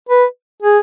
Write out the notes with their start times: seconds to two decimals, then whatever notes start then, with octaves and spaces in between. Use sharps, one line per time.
0.09 B4
0.63 G#4